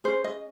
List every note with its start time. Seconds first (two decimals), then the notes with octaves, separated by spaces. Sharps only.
0.04 C#4 G#4 C5
0.24 D#5